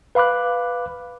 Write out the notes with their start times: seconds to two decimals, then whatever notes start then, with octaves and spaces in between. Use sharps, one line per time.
0.15 B4 F5 B5 D6 F#6